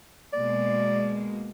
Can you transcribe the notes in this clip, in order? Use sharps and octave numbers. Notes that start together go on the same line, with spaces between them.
B2 G#3 A#3 D5